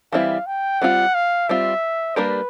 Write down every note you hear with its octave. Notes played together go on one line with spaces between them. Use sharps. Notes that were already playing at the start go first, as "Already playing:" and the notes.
E3 G3 C4 E4 F5
G5
G3 C4 F4 F#5
F5
G3 C4 F4 E5
G3 A#3 D4 G4 A#4 B4